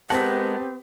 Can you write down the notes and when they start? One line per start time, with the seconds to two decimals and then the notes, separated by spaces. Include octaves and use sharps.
0.10 G#3 B3 C4 G4 A#4 F#5 A5 B6